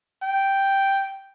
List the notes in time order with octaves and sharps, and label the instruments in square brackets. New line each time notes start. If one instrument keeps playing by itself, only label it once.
[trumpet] G5